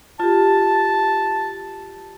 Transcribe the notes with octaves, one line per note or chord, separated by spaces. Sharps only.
F4 G4 A5